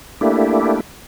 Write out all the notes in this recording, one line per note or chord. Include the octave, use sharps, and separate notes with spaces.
A3 A#3 D4 E4 G4